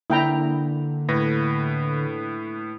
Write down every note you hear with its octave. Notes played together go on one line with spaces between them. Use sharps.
D3 A#3 D4 E4 G5 A#5
A2 B4 A#6